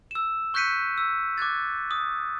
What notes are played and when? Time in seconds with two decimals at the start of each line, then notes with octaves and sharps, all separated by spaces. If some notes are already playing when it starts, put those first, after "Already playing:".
0.11 E6 E7
0.54 C#6 F#6 G6 B6 C#7 D#7
0.98 E6
1.38 D6 F#6 G#6 A6
1.91 D#6